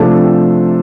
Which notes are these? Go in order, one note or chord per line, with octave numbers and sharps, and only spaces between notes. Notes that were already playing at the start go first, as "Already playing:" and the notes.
Already playing: C3 F3 A3 D4 A4